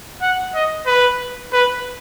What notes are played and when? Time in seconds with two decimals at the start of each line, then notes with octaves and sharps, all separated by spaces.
0.21 F#5
0.55 D#5
0.86 B4
1.53 B4